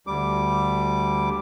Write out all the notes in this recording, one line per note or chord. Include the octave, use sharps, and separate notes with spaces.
D2 G3 D6